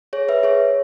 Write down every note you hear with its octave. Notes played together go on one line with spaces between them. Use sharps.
G#4 C#5
B4 E5
G#4 C#5